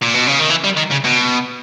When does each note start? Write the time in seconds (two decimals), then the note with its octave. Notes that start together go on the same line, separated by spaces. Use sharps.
0.02 A#2
0.14 B2
0.27 C#3
0.39 D#3
0.50 E3
0.64 G3
0.77 D#3
0.91 C#3
1.04 B2